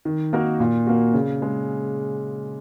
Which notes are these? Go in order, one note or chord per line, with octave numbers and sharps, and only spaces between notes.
D#3
A#3 D#4 F#4 A#4
A#2
A#3 F#4
C#3
G#3